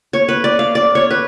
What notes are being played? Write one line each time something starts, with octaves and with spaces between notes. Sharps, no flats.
C#5
B4
D5
F5
D5
C#5
B4